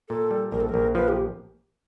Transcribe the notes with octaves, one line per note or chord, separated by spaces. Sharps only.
A#2 A4
G3
A#1 A#4
A4
A#1 A#4
F3 B4
G4